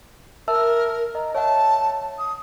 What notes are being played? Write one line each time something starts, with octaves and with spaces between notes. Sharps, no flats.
A#4 E5 A5 E6
D#5 A#5
C#5 E5 F#5 A5
D#6